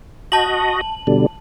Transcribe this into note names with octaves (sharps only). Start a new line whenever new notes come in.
F#4 D#5 A5 F#7
B2 D3 G3